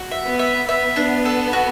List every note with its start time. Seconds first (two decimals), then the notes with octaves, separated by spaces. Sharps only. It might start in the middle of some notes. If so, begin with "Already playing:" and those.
Already playing: F#4
0.11 E5
0.25 B3
0.39 E5
0.68 B3 E5
0.96 D4
1.25 A4
1.53 F#4